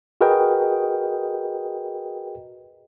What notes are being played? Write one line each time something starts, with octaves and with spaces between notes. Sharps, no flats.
F#4 G#4 A#4 B4 D#5 G5